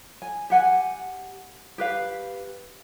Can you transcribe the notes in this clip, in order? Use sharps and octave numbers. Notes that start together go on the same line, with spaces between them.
G#5
G4 F#5 G#5
G4 B4 F5